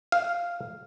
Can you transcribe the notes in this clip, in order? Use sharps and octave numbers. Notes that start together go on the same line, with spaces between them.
F5